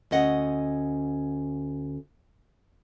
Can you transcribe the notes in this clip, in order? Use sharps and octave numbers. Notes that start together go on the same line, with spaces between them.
D2 C#4 D#5 F#5